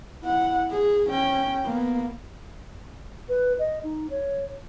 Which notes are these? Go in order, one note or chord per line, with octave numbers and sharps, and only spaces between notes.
E4 F#5
G#4
C#4 G5
A#3 B3
B4
D#5
D#4
C#5